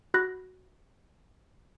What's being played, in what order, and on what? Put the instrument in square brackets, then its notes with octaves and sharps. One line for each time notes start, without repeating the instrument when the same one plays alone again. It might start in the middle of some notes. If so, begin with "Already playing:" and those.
[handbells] F#4 B5 F#6 A#6